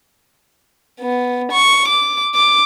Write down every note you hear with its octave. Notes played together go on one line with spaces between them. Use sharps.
B3
C#6
D6
D6